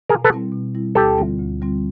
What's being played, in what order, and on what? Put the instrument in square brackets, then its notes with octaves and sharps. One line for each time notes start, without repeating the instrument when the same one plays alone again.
[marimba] B2 [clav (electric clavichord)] G#4 A#4
[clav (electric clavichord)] A4 B4
[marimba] G3 C4 E4
B2
G3 C4 E4
[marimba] D2 [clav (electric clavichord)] G4 A4
[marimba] D3 G3 C4 F4
D2
D3 G3 C4 F4